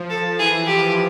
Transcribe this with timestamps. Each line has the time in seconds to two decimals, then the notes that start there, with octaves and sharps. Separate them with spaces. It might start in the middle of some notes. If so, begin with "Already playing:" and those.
Already playing: F3
0.10 A4
0.38 E3 G#4
0.66 F3 G4